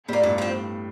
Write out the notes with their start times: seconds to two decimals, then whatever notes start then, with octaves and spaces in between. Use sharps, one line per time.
0.08 A2 G3 A#3
0.23 G2 A#2
0.38 F3 C4